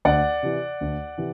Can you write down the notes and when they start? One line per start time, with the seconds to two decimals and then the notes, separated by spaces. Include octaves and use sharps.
0.05 D2 D5 F#5
0.43 C3 E3
0.81 D2
1.18 C3 E3